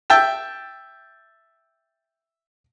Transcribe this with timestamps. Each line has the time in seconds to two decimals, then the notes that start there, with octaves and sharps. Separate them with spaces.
0.10 E5 G5 A5